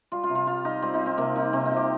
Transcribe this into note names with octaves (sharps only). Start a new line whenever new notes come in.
G3 F4
F4
C3
F4
G3 F4
G3 D#4
G3 C4
D#4
G3
C4
C3 A#3
G3 D#4
C3 C4
D#4
C3
G4